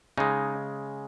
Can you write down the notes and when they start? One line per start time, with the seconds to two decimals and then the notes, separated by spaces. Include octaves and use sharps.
0.18 C#3 G#3 D#4